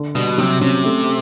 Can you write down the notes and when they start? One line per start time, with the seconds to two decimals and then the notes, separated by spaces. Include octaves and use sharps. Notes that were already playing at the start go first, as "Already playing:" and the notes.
Already playing: D3
0.15 B2 G3
0.38 C3 F#3
0.61 C3 C#4
0.85 A3